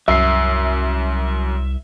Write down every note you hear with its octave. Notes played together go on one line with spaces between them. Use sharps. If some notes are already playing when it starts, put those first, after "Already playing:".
C2 F#2 E5 C7